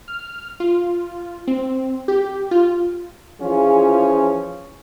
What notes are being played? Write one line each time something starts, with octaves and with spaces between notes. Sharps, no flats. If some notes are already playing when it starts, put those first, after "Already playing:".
F6
F4
C4
G4
F4
E3 F3 C#4 F4 G#4